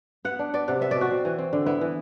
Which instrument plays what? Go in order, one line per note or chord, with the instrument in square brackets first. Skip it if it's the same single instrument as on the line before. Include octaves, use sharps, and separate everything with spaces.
[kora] B3 F#5
D4
B3 D5
C3 F#5
B3 E5
B2 D5
F#4
C4
E3
C4
D3
B3 E4
E3